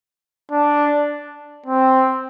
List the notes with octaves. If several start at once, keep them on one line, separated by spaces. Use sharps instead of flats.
D4
C4